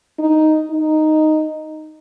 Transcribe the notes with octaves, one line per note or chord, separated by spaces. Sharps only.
D#4
D#4